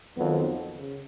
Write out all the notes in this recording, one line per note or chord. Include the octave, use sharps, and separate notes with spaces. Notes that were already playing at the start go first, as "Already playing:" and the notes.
F2 D#3 F#3 B3 F#4
C#3